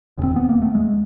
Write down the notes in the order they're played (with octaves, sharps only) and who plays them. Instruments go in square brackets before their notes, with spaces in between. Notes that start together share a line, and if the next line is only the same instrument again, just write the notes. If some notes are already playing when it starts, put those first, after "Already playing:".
[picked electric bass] E1 D#2 C#3
C4
B3
A#3
A3
G#3